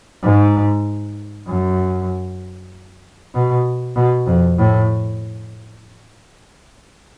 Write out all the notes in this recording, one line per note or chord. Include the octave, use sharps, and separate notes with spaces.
G#2
F#2
B2
B2
F2
A2